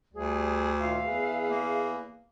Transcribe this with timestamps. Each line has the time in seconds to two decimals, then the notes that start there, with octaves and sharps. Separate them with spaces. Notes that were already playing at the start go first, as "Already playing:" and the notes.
0.13 D2 G3 G#4
0.78 A#2 D#3 F4 E5 F5
1.05 E2 G#4 B4
1.50 A#3